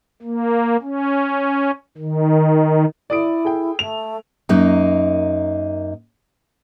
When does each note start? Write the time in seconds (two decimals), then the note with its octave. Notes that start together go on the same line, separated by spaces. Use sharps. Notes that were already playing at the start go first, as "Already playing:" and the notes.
0.22 A#3
0.82 C#4
1.98 D#3
3.10 E4 D5 D#6 D7
3.45 G#4 A4 G5
3.79 A3 F7
4.49 F#2 A#3 D#4